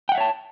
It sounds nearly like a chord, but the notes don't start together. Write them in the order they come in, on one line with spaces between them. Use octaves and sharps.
G5 F#5 E5 C#5 A5